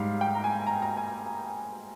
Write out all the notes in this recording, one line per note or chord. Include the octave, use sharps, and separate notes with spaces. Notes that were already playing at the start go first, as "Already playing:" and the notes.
Already playing: G#2 G3 F5
G5
A#5
G#5
A#5
A#5
G#5